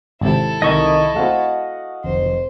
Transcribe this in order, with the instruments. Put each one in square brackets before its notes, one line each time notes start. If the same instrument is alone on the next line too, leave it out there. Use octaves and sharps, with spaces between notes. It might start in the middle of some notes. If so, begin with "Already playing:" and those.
[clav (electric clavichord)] G#1 C3 [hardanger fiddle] E4 A4
[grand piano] C2 D#3 [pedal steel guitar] D#5 C#6
[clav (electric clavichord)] A3 C4 [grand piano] F#4 F5 F#5
[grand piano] F1 [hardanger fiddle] C5